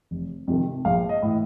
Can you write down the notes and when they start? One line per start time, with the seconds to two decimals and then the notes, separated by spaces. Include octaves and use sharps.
0.11 F1
0.48 F2 C3 D#3
0.85 A#1 F5
1.09 D#5
1.22 A2 E3